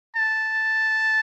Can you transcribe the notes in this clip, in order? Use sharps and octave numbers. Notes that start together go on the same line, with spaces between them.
A5